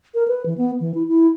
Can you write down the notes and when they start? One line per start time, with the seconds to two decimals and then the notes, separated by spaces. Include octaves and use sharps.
0.15 A#4
0.28 B4
0.46 E3
0.58 B3
0.80 E3
0.95 E4
1.08 E4